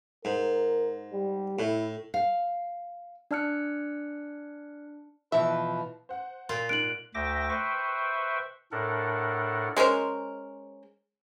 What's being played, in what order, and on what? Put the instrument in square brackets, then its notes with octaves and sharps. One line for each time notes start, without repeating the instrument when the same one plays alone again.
[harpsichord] G#2 [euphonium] A#4
[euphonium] G3
[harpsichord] A2 [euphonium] E4
[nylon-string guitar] F5
[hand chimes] D4 D5 A5 F6 F#6 C#7
[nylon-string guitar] B2 E3 F3 [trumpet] B4 [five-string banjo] E5
[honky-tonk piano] C5 F#5
[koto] A#2 F4
[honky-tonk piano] G#2 F#6 [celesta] D7 F#7
[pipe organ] D2 E5 G5 D6 A#6
B4 C5 E5 G5 C#6
A2 D4 A4 A#4 F#5
[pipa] G#3 C#4 A#4 C5